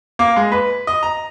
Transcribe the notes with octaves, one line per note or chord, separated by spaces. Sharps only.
A#3
G#3
B4
D#5
A#5